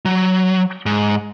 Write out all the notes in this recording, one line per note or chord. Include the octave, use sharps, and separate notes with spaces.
F#3
G#2